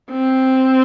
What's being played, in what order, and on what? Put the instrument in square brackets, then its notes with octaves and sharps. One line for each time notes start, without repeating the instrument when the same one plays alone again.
[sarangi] C4